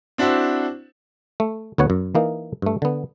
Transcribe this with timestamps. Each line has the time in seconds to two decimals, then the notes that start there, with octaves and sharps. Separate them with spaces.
0.18 C4 D4 E4 F#4 C5
1.40 A3
1.78 D2 B3 C#5 F#5
1.90 F#2
2.15 E3 A#3 D#4
2.62 G2 A3
2.82 D3 B3